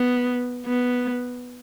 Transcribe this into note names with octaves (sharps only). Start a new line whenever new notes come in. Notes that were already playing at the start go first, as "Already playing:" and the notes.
Already playing: B3
B3